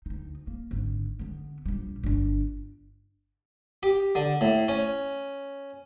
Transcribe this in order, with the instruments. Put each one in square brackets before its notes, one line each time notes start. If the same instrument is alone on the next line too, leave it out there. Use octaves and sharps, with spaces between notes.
[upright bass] D2 D#4
A#3
G#1 D3
D3 B3
A#1 G3
G1 D4
[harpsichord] G4
D3
A2
C#4